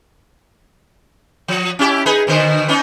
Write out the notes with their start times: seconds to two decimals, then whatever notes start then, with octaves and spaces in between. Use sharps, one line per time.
1.48 F3
1.79 C#4 E4 G4
2.06 D#4 G#4 B4
2.27 B2 D3 C5
2.68 B3 C#4 D#4